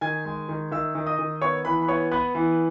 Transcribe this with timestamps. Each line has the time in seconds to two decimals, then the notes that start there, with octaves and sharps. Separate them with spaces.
0.01 D#3 G#5 G#6
0.25 G#3
0.49 D#3
0.72 D#3 E5 E6
0.95 D#3
1.07 D#5 D#6
1.19 D#3
1.42 B3 C#5 C#6
1.65 E3 B4 B5
1.82 B5
1.88 B3 C#5 C#6
2.11 B3 B4 B5
2.35 E3